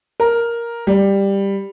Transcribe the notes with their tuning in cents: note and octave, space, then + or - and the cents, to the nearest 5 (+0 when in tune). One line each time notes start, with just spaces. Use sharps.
A#4 +5
G3 +10